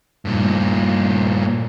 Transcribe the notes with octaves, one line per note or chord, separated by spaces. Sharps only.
G2 A#2